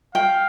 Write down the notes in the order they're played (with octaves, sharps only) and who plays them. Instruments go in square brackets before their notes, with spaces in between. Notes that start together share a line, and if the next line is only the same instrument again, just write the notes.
[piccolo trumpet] F5 [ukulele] G5